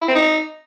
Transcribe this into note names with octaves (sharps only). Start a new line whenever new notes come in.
E4
C4
D#4